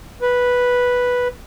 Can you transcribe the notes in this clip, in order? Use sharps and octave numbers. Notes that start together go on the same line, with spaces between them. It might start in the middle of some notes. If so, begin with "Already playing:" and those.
B4